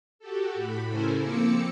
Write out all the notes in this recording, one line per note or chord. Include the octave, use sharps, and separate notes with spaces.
F#4 G4 A4
A2 B5
C#3 E4 A4 A#4 C5 G#5
F3 A#3 C4 D6 E6 C#7